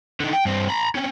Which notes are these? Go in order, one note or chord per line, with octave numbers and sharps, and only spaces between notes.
D3 D#3
G5
G2 C4
A#5 B5
C4 C#4